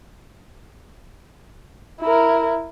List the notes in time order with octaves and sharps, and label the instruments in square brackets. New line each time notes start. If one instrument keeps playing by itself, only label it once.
[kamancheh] E4 A#4